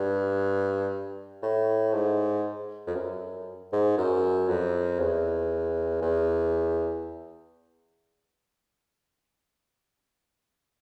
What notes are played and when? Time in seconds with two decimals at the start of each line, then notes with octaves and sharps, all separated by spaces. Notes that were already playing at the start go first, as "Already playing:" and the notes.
Already playing: G2
1.42 A2
1.93 G#2
2.87 F2
2.95 F#2
3.72 G#2
3.98 F#2
4.48 F2
4.99 E2
6.02 E2